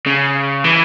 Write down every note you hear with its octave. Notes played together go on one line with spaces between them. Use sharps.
C#3
E3